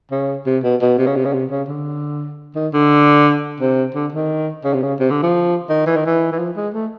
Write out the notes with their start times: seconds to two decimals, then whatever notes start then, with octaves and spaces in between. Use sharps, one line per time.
0.11 C#3
0.46 C3
0.63 B2
0.81 B2
0.98 C3
1.07 C#3
1.16 C3
1.25 C#3
1.33 C3
1.50 C#3
1.68 D3
2.55 D#3
2.73 D3
3.60 C3
3.95 D3
4.12 D#3
4.64 C#3
4.74 C3
4.83 C#3
4.99 C3
5.11 D3
5.23 F3
5.69 D#3
5.87 E3
5.96 D#3
6.06 E3
6.32 E3
6.39 F3
6.57 G#3
6.74 A3